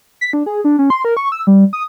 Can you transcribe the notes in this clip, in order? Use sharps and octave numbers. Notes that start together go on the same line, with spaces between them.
B6
D4
G#4
D4
C#4
C6
A#4
C#6
E6
G3
D#6